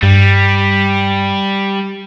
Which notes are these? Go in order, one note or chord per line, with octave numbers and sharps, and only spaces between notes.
G2 G3